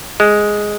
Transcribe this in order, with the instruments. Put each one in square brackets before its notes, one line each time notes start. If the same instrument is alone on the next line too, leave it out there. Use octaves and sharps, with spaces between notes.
[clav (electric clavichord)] G#3